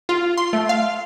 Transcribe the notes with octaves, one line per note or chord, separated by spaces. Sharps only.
F4
C6
A3
F5